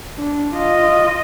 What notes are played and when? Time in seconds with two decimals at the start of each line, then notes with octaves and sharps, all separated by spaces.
0.17 D4
0.56 F4 D#5